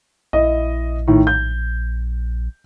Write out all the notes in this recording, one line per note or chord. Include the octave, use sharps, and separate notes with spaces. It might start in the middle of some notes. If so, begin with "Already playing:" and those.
A#1 E4 D#5
A2 D#3
G6